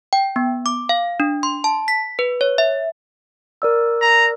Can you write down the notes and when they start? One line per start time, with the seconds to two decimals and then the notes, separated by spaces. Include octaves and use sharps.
0.13 G5
0.36 B3
0.66 D6
0.89 F5
1.20 D4
1.43 C6
1.64 A5
1.88 B6
2.19 B4
2.41 C#5
2.58 E5
3.62 A#4 D5 E6
4.01 A#5